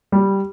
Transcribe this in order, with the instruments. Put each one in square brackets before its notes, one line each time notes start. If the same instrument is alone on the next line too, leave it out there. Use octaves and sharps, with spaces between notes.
[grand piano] G3